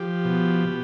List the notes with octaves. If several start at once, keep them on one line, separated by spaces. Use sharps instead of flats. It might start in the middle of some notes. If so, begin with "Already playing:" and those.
Already playing: F3 G4
B2
B2